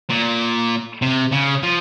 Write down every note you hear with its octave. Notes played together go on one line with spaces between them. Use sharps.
A#2
C3
C#3
F3